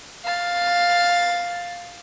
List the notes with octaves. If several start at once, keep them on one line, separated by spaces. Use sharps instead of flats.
F5 A6